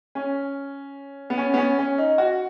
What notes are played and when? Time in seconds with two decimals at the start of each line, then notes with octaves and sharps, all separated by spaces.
0.15 C#4
1.30 B3
1.38 C#4
1.54 B3
1.58 C#4
1.79 C#4
1.98 D#4
2.18 F#4